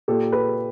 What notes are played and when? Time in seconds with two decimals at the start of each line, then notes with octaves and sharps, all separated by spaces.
0.08 A#2 G4 A4
0.32 A4 B4